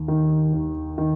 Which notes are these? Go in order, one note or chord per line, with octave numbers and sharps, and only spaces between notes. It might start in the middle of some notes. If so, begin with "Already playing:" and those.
Already playing: D#2
D#3
D#2
D#3